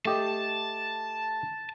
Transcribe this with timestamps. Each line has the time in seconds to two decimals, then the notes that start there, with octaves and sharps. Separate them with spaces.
0.05 A3 G4 D#5 A5